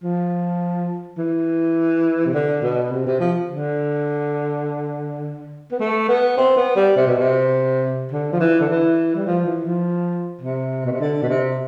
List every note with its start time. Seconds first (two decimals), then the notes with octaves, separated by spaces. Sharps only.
0.03 F3
1.18 E3
2.26 C3
2.33 D3
2.62 B2
2.92 C3
3.06 C3
3.20 F3
3.49 D3
5.72 B3
5.79 A3
6.08 B3
6.37 C4
6.56 B3
6.76 G3
6.96 C3
7.07 B2
7.19 C3
8.11 D3
8.33 F3
8.40 E3
8.60 D3
8.69 E3
9.16 G3
9.26 F3
9.45 E3
9.65 F3
10.41 C3
10.85 B2
10.92 C3
11.00 D3
11.22 B2
11.28 C3